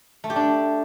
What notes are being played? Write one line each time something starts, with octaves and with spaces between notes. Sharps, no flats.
A3
G4
D4